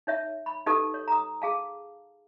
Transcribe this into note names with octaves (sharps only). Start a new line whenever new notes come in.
D#4 C#5 E5
B5
D#4 G4 A4 B4 A5 D#6
C#5
A#5 D#6
G#4 F5 A5